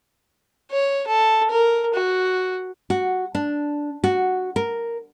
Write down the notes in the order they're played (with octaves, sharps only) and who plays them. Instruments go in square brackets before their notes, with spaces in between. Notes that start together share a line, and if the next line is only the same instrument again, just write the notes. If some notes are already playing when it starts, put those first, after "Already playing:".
[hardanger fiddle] C#5
A4
A#4
F#4
[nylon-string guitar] F#4
D4
F#4
A#4